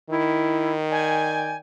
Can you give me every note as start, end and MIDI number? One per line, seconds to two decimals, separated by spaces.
0.10 1.58 51
0.10 0.73 64
0.91 1.55 74
0.91 1.55 79
0.91 1.55 80